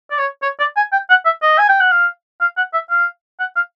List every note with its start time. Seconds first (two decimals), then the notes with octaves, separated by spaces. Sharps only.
0.11 D5
0.18 C#5
0.43 C#5
0.60 D5
0.77 G#5
0.93 G5
1.10 F#5
1.25 E5
1.42 D#5
1.59 G#5
1.69 G5
1.80 F#5
1.92 F5
2.41 F5
2.57 F#5
2.74 E5
2.90 F5
3.40 F#5
3.56 F5